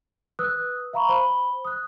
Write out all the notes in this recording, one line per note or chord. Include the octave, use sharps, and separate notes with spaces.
B4 D#6 E6 F#6
E5 F5 A#5 B5 C#6
C5 B5 G7
D#6 F#6